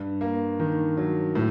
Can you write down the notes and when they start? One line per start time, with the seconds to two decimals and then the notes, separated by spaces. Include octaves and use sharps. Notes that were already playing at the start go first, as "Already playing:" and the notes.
Already playing: G2
0.21 A#3
0.59 D#3
0.97 F#3
1.35 A2